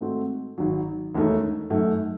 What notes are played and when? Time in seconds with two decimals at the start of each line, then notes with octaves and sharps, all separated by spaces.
0.01 G#2 D#3 A3 C4 F#4
0.58 G#1 G#2 F#3
1.14 E1 D#2 D#3 A3
1.70 F#2 D#3 A3